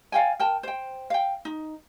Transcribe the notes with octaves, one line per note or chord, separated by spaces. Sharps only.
D5 F5 G5 G#5
A#4 G5 A5
C5 G5
F5 G5
D#4